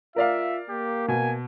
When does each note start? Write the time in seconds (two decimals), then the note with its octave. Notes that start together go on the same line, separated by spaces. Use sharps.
0.16 F4 A#4 D5 E5 F5
0.69 A#3 G4
1.08 B2 G#5